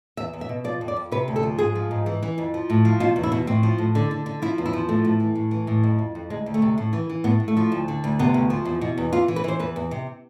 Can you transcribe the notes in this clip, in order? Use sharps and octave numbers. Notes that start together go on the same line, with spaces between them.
E2 E5
E2
E5
B2
F3 D5
F2
D5
F2
C3 B4
D2
A4
F3
G#2 G#4
F3
G#2
E3
E3
F2
F3
A2
F3
B2 F4
E2
E4
B2
A2 C4
F3
A2
D3
D3
D3
F3 E4
E2
E4
F3
A2 A3
A2
E3
A2
E3
A2
F2
F2
F2
D2 G#3
D2
A3
C3
A2
E3
E3
A2 B3
A2
A3
F3
D2
D3
D2
C3 B3
D2
F3
E2
B2
E2
E3 F4
E3
B4
E3 C5
E2 B4
E2
C3